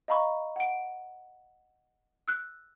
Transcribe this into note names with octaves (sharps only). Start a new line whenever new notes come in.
D#5 F5 A#5 B5 C#6
F#5 D7
E6 F#6